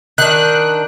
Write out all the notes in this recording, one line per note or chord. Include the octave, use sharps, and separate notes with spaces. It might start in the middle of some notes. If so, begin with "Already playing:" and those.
D#3 D4 F#6